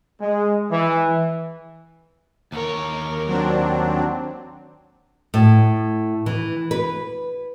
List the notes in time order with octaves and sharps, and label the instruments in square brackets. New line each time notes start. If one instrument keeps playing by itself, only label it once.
[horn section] G#3
E3
[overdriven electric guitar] D#2 C#5 [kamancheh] A#4
[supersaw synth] F#3 C4 D4
[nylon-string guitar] A2
E3
B4